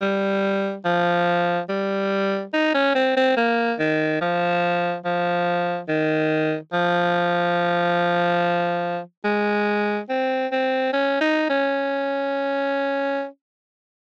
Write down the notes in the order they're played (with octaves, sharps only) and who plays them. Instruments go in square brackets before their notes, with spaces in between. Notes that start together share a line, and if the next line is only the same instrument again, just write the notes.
[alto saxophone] G3
F3
G3
D#4
C#4
C4
C4
A#3
D#3
F3
F3
D#3
F3
G#3
C4
C4
C#4
D#4
C#4